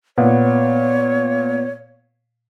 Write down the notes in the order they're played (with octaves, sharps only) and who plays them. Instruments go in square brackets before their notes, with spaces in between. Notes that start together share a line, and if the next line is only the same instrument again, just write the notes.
[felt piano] A#2 [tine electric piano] B3 [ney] C#5